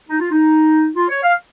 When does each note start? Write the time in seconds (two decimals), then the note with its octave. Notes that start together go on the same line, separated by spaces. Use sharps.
0.09 D#4
0.20 F4
0.31 D#4
0.95 F4
1.09 C#5
1.23 F5